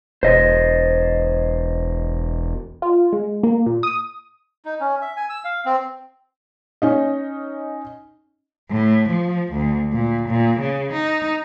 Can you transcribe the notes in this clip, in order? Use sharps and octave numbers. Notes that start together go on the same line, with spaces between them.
E1 C5 D#5
F4
G#3
A#3
A#2
D#6
D#4
C#4
E5
G#5
E6
F5
C4
C#4 D#4 D#5
A2
F3
D2
A#2
A#2
C#3
D#4